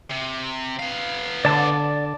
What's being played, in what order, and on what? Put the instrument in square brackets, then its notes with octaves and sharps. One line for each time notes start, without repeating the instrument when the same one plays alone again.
[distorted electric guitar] C3
B3 F5
[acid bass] D3 [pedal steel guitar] D5 A5 D6